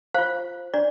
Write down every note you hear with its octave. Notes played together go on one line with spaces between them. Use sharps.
F4 C5 F5
D4 D5